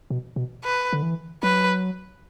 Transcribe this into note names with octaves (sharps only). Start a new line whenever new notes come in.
B2
B2
B4
D3
E3
F#3 B4